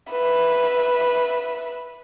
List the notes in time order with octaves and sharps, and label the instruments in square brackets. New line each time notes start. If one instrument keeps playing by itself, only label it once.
[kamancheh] B4 E5